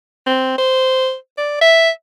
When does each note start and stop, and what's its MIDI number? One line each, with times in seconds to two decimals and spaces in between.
0.27 0.57 60
0.58 1.15 72
1.38 1.59 74
1.61 1.90 76